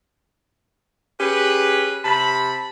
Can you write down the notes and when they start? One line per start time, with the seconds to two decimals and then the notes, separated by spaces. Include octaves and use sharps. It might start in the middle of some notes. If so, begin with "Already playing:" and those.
1.20 C#4 G4 G#4 B4
2.05 C3 A5 B5